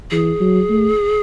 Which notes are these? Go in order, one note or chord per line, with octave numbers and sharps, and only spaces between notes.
E3 G#4
F#3
A3